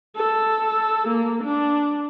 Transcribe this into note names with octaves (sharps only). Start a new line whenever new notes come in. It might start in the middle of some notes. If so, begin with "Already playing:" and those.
A4
A#3
D4